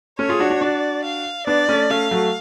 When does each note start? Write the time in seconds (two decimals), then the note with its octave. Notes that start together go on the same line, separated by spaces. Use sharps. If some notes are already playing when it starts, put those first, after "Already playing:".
0.19 A3 C#4 C#5
0.29 F4 G#4
0.40 D4 F#4
0.50 D4 F#4
0.61 D4 F#4 D5
1.04 F5
1.47 B3 D4 D5
1.69 A3 C#4
1.90 A3 C#4 F5
2.11 F#3 A3